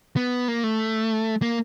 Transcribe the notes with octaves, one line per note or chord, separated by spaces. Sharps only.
B3
A#3
A3
A#3